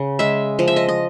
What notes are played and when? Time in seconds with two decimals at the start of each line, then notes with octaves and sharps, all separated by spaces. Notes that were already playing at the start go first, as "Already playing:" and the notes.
Already playing: C#3
0.19 G#3 E5
0.59 F3 D#5
0.68 E5
0.76 D#5
0.88 D#5